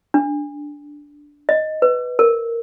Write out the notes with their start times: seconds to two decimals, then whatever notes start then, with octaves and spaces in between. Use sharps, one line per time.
0.14 D4
1.49 D#5
1.82 B4
2.19 A#4